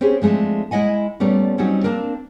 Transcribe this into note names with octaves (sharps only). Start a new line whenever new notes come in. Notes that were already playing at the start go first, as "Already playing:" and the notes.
C4 C#4 G4 G#4 C5
F3 G#3 A3 C4 D4
G#3 E4 D#5 F#5 G#5
A#2 G3 A3 B3 C#4
F#3 G3 C4 C#4 D#4 F#4
A#3 C4 D4 A#4